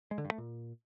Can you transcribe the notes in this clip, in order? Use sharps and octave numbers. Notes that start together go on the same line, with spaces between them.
G#3
D3
G2
A3
A#2